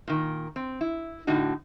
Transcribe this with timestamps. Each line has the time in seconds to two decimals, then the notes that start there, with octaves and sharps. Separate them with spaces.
0.08 A#2 D#3
0.56 C4
0.81 E4
1.27 A2 D3 D#4 F#4